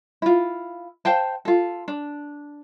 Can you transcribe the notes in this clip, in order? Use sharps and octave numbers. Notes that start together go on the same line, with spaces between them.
E4 F4
C5 F5 G5 A5
F4 A4
D4